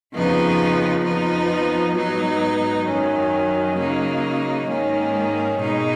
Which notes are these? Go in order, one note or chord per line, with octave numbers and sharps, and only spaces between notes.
F2 C#3 F3 B3 D#4
F2 F3 B3 D#4
G#2 F#3 B3 D#4
F#2 D#3 F#3 C#4
C#3 F#3 A#3 D#4
G#2 D#3 A#3 C#4
B2 G#3 D#4